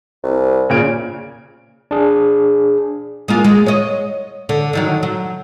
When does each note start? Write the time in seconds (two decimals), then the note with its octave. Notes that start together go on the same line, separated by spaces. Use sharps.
0.23 C2
0.70 A#2 C#3 D7
1.91 D4 G#4
3.28 G#3 A#3 F4
3.44 G#3
3.66 C#5 D#5
4.49 D3
4.73 D3 D#3 F#3
5.03 F#3